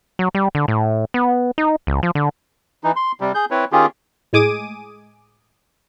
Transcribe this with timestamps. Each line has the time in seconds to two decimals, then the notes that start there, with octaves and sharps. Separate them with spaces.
0.19 F#3
0.35 G3
0.55 D3
0.68 A2
1.14 B3
1.58 D#4
1.87 C#2
2.03 F3
2.15 D3
2.84 E3 D#4
2.96 C6
3.21 C3 G3
3.35 G#4 G6
3.51 C4 E4 B4 C#5
3.72 D#3 C#4 F4 G4 G#4
4.33 A2 G#3 G#5 D6 D#6 D#7